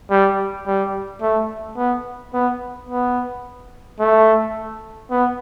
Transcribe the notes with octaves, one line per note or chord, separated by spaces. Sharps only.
G3
G3
A3
B3
B3
B3
A3
B3